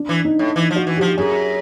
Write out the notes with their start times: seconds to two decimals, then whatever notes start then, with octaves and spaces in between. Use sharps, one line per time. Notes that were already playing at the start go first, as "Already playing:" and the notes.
Already playing: D4
0.09 E3
0.24 D#4
0.39 A2
0.56 E3
0.71 F3
0.76 F#4
0.87 E3
0.97 F3 G4
1.17 F#2 G#4